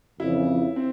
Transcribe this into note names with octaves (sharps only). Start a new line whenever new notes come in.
F2 C#3 E3 E4
C4